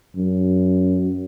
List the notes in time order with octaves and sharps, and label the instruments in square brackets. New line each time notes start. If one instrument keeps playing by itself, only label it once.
[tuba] F#2